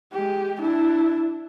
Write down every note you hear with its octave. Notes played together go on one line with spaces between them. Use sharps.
G#3 G4
D4 E4